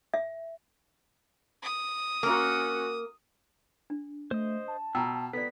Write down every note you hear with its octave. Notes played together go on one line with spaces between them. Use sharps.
E5
D#6
A#3 C#4 F#4 A#4
D4
A3 C5 D#5
A5
B2 G5 A#5 E6
B3 A4 D5 B6